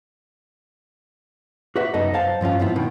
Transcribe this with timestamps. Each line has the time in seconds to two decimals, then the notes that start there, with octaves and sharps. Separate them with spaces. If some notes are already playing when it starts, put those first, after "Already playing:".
1.76 F#4 B4 E5
1.94 C2 F#2 B3 D#4 A4 D#5
2.14 C5 F5 A5
2.41 G2 F3 C#4 F4
2.59 G#2 F3 B3 E4
2.76 B2 D#3